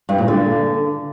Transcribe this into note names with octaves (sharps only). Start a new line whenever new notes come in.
G2
A#2
D3